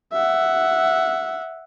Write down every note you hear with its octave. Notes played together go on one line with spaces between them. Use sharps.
E5 F#5